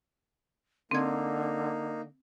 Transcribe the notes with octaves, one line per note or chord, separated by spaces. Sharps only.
D3 A#3 C4 D#4 G#6